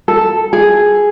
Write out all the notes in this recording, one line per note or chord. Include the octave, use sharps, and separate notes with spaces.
A4
G#4